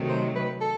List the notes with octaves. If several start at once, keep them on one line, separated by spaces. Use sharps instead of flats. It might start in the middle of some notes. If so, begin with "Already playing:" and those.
Already playing: C3 D#3 F#3 A3
C5
B4
A4